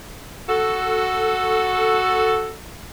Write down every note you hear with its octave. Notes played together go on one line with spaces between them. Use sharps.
F#4 A4